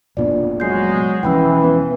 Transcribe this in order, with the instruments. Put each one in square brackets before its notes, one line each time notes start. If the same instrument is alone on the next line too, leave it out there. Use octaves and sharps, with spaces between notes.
[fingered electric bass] F1 A#2 B3 [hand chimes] D4 F4 D5
[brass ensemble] F#3 G#3 [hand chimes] G6 C7
[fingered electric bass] E1 F3 C#4 [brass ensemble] E3 [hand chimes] G5 B5 E6
[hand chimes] B3 B4